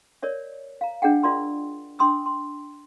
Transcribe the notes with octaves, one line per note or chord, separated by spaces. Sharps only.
A#4 C#5 D5 E5
F5 A#5
D4 G#4 D#5 F#5 G5
F4 A#4 D5 E5 C6 E6
D4 G5 C6 D#6 E6
C6